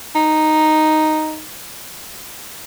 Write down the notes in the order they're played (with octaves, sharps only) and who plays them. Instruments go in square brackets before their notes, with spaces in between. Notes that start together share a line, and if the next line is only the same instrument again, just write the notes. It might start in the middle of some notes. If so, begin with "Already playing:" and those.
[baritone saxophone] D#4